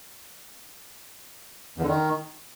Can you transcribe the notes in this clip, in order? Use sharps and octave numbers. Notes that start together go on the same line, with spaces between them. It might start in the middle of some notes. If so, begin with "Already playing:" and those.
E2
D3
D#3